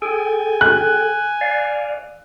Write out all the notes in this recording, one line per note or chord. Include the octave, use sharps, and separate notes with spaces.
G#4 A4 G5 G#5
F#6
D5 F5